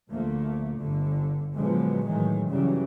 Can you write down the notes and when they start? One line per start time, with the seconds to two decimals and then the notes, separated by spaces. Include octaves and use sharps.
0.11 D2 D3 F3 A3 A#3
0.78 G1 D3
1.55 A#2 D3 F3 F#3 G#3 B3
2.07 A2 D#3 E3 F#3 G#3
2.48 G2 C#3 E3 F#3 G3